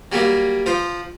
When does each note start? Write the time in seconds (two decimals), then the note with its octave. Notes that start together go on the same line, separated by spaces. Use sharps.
0.12 F#3 G3 A#3
0.66 F3 C5